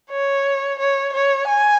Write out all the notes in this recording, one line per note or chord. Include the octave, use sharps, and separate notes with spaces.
C#5
C#5
C#5
G#5